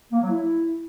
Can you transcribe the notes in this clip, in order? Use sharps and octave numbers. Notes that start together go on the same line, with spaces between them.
A#3
F#3
E4